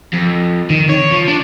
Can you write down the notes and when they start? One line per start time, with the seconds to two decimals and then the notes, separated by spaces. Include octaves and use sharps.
0.13 F2
0.70 D#3
0.90 C#5
1.12 F3
1.28 D4